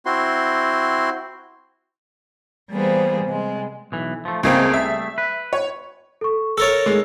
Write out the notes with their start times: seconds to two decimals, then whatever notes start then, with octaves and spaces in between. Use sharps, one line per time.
0.06 C4 E4 F#4 C6
2.71 E3 G3 A#3 B3 G#4 C5
3.25 C3 G3 G#3
3.92 B1 E3
4.25 F3 A3
4.43 C#2 G3 A3 A#3 C4 G#4
4.74 E5
5.18 B4
5.53 C#5
6.21 A4 C#6
6.58 A4 A#4 C#5 E6 A6
6.86 G#3